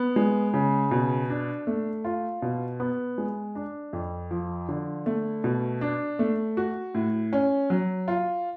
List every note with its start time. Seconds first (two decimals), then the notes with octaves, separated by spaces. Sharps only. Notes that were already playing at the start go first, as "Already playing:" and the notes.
Already playing: B3
0.16 G#3
0.53 C#3
0.91 B2
1.30 D4
1.67 A3
2.05 F4
2.42 B2
2.80 B3
3.18 G#3
3.55 D4
3.93 F2
4.31 F3
4.69 D3
5.06 A3
5.44 B2
5.81 D4
6.19 A3
6.57 F#4
6.95 A2
7.33 C#4
7.70 F#3
8.08 F4